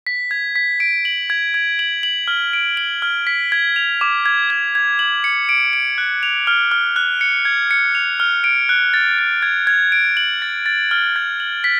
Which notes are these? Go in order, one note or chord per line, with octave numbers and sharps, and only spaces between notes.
B6
G#6
B6
D7
F#7
G#6
G#6
F#7
F#7
F6
D7
F#7
F6
B6
G#6
F7
D6
G#6
G#6
G#6
F#7
C#7
D7
D7
F#6
F7
F6
F6
F#6
C#7
G#6
C#7
F7
F6
D7
F#6
A6
A6
G#6
G#6
D7
F#7
A6
A6
F6
G#6
F#7
B6